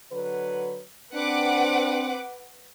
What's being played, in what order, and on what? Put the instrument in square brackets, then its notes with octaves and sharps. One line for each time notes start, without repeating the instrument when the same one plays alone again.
[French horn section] D3 F#3 B4
[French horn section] C4 [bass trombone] D4 [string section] B4 F#5 D6